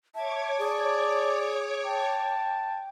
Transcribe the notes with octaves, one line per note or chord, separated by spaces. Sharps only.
C#5 E5 A5 D6 G#6
G#4 D5
G5 A5